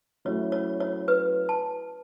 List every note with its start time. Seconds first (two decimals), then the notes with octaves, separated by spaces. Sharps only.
0.25 F#3 A3 C#4 E4 C#5
0.52 C#5
0.80 C#5
1.08 B4
1.49 A5